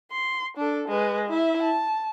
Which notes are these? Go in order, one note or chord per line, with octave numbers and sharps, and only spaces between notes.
C6
D4 A4
G#3 B4
E4 E5
A5